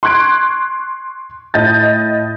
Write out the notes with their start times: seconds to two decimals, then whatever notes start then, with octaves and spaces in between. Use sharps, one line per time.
0.03 C6 C#6 F#6 G#6 D7
1.54 A2 D#5 A5 G6 A6